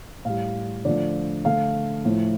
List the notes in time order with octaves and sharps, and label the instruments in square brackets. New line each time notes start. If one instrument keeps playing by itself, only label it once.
[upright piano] A2 G3 F5
D3 F3 A3 D5
D3 A3 F5
A2 F3 A3